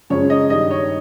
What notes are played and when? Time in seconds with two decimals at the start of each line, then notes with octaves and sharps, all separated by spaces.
0.10 F#2 C#3 F3 G#3 C#5
0.30 D#5
0.50 G2 D#3 G3 D#5
0.71 C#5